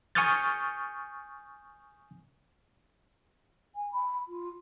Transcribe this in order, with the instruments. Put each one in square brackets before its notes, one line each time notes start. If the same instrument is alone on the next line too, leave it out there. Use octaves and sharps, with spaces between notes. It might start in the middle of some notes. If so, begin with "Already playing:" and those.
[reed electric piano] G#5 C#6 D#6 F6 G6 A6
[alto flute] G#5
B5
F4